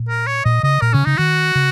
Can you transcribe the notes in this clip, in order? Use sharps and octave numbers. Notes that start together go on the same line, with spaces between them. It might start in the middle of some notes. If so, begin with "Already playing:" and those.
Already playing: A#2
A#4
C#5
A#2 D#5
C#3 D#5
A#2 A#4
C#3 C#4
C#3 D#4
D#3 F#4
C#3